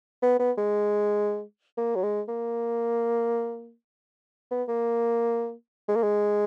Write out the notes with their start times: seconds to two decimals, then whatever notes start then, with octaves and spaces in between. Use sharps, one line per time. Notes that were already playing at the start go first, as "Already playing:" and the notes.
0.22 B3
0.39 B3
0.58 G#3
1.77 A#3
1.95 F#3
2.03 G#3
2.28 A#3
4.51 B3
4.68 A#3
5.88 G#3
5.96 A#3
6.03 G#3